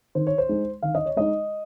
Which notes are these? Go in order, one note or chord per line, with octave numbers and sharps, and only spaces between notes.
D#3 C5
C#5
C5
G#3 D#4
D#3 F5
D#5
C#5
G#3 D#4 D#5